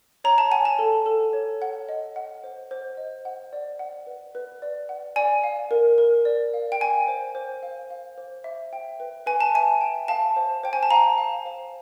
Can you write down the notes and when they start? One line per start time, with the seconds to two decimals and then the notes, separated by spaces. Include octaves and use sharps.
0.24 C#5 A#5
0.38 A5
0.51 F#5 G#5
0.65 A5
0.79 A4
1.06 A4
1.33 C#5
1.62 F#5
1.89 D#5
2.16 F#5
2.44 C5
2.71 C5
2.97 D#5
3.25 F#5
3.53 D5
3.79 F#5
4.07 B4
4.35 B4
4.62 D5
4.89 F#5
5.16 D5 G#5
5.44 F5
5.71 A#4
5.98 A#4
6.25 D5
6.54 F5
6.72 G5
6.80 F5 G#5
7.08 C5
7.35 C5
7.63 F5
7.90 F5
8.18 C5
8.44 E5
8.73 G5
9.00 B4
9.26 B4 G#5
9.41 A5
9.55 E5 G#5
9.81 G5
10.08 F5 A5
10.36 C5
10.64 C5 G5
10.73 G#5
10.83 A5
10.91 F5 A#5
11.18 F5
11.45 C5